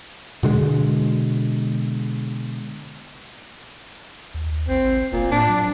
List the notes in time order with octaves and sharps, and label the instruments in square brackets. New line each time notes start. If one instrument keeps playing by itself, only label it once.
[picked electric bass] B2 D3 G#3
[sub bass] D#2
[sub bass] A1 [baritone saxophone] C4
[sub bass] F1 [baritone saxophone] A#2
[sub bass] A2 [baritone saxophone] D4
[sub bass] F#3